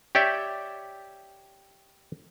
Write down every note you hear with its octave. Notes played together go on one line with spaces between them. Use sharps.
G4 C#5 D5 E5 G5